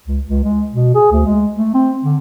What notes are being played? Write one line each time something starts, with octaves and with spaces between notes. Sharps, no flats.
C#2
C#2
G#3
B2
G#4
D2
G#3
A3
C4
D3